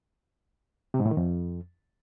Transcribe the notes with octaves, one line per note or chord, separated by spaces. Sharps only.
C3
G#2
A2
D#3
F2